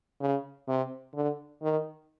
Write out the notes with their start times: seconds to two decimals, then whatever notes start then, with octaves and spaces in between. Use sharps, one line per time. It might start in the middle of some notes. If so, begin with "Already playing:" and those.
0.21 C#3
0.68 C3
1.15 D3
1.63 D#3